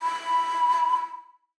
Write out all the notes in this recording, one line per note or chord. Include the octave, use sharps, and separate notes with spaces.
B5